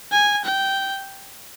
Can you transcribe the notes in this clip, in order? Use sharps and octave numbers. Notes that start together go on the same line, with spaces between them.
G#5
G5